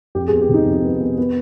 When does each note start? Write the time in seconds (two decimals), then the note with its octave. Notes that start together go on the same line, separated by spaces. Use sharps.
0.15 F2 G4
0.28 G#4
0.32 B3
0.41 G4
0.49 C3 D#4
0.66 F2
0.84 B3
1.01 B3
1.18 B3